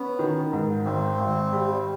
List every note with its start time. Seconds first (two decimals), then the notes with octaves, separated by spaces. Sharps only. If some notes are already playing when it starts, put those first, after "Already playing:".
Already playing: B3 C#4
0.19 D#3
0.52 G#2
0.85 G#1 C4
1.19 G#1
1.52 G3